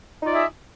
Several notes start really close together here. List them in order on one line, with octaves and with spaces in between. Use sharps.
D#4 F4 D5 E5 G#4